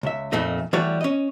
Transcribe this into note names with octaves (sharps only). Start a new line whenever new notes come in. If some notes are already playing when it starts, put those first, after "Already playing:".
C#2 E5
F2 A#2 A3 D#4
E3 G3 A3 F#4 C#5 D5
C#4 D#5